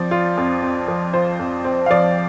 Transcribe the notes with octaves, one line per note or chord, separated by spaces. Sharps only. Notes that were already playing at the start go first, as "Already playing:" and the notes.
Already playing: F3 C4 D5
F4
F2
C4
F3
F4 C5
F2
C4
F5
F3 D5